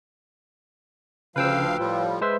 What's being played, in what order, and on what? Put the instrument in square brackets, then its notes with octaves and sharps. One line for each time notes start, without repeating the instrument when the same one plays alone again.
[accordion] D2 F3 F5 [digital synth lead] C#3 [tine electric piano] B4 G5 E6
[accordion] A2 F3 G3 [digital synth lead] F4
[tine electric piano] G#3 C5 E5 [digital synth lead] B4